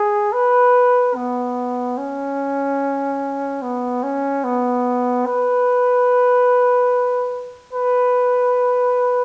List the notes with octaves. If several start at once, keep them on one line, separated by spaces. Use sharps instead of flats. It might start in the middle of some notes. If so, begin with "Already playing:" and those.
Already playing: G#4
B4
B3
C#4
B3
C#4
B3
B4
B4